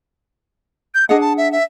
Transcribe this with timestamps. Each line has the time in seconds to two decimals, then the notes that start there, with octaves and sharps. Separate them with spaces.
0.94 G6
1.09 D4 G#4 D#5 F#5
1.21 A5
1.37 E5
1.52 E5